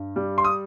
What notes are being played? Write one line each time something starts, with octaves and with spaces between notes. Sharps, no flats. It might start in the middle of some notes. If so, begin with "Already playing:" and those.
Already playing: G2
G3
C6
D#6